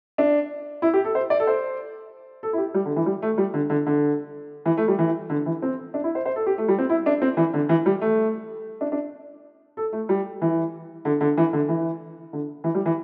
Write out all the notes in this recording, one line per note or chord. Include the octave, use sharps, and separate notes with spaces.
D4
E4
G4
A4
C5
D5
A4
C5
A4
E4
G4
G3
D3
E3
G3
A3
G3
D3
D3
D3
E3
A3
G3
E3
D3
E3
C4
D4
E4
C5
C5
A4
G4
A3
G3
C4
E4
D4
C4
E3
D3
E3
G3
A3
D4
D4
A4
A3
G3
E3
D3
D3
E3
D3
E3
D3
E3
G3
E3